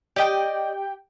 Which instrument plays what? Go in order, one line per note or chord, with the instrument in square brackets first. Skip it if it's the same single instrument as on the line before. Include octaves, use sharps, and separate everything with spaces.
[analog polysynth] G4 G5 [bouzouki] D5 D#5